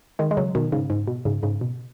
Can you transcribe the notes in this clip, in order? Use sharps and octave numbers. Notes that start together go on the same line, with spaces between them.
D#3 G#3
G#3
C#3 F#3
B2 D#3
G#2 C#3
G#2
B2
G#2 C#3
G#2 C#3
B2